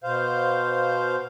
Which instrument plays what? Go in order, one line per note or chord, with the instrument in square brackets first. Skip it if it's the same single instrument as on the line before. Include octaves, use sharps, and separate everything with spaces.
[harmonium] B2 C5 F5